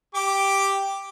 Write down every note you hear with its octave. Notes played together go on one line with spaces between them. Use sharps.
G4 D6